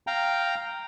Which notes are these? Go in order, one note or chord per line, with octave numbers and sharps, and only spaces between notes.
F5 G5 A#5